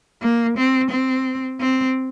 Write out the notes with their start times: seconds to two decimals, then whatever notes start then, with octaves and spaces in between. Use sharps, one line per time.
0.22 A#3
0.57 C4
0.91 C4
1.60 C4